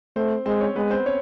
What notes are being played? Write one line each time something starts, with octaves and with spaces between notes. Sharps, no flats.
A3 C4 C5
G#3 C4 C5
C#4 C#5
G#3 B3 B4
C4 C5
C#4 C#5